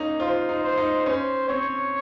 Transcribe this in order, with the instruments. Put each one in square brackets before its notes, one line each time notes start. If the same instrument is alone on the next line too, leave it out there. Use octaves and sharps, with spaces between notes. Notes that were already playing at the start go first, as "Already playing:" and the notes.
Already playing: [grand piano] A#3 C#4 D#4
[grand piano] F4 [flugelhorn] C5
[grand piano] D#4
[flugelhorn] C5
[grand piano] D#4
[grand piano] C#4 [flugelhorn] C5
[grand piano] C4 [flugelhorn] C#5